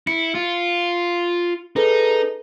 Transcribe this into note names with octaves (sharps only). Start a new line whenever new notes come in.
E4 C#7
F4
D#4 G#4 A4 B4